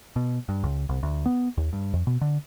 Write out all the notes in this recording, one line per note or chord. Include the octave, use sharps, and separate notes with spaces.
B2
G2
C#2
C2
D2
B3
D#2
G2
F2
B2
D3